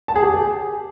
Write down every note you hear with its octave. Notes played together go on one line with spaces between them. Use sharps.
A5
G#4
G4